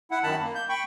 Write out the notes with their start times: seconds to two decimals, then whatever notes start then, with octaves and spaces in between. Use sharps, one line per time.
0.11 E4 F#5
0.23 F#2 D#3 A5 B5
0.41 A#3
0.55 G6
0.69 G5 B5 C#6